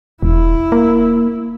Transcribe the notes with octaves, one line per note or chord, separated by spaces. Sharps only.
E1 E4
A#3